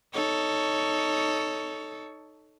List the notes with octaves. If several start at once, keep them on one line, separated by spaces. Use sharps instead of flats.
D#4 A4 C#5